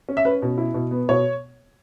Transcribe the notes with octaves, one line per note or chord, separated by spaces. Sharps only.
C#4
E5
C#4 B4
B2
E4
B2
B3
B2 C#5